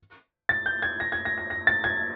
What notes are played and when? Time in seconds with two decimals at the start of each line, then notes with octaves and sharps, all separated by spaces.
0.49 A6
0.66 G6
0.82 G#6
1.00 A#6
1.12 G#6
1.25 A#6
1.38 A#6
1.50 A#6
1.67 A6
1.84 G#6